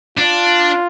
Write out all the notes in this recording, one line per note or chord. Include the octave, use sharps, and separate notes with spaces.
D4 F4